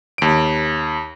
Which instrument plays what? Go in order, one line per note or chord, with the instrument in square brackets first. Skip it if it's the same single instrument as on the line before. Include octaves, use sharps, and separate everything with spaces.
[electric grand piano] D#2 D7